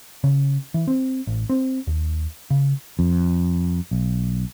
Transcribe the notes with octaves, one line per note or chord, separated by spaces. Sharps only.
C#3
E3
C4
A1
C4
D#2
C#3
F2
B1